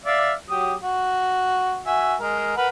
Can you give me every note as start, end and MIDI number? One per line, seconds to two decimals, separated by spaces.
0.05 0.33 74
0.05 0.33 76
0.05 0.33 77
0.49 0.74 54
0.49 0.74 67
0.49 0.74 87
0.82 1.81 66
1.86 2.15 66
1.86 2.15 76
1.86 2.15 80
2.20 2.56 56
2.20 2.56 70
2.57 2.68 70
2.57 2.68 71
2.57 2.68 78